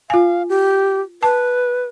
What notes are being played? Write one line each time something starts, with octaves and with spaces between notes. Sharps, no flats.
F4 F5 G#5
G4
B4 A5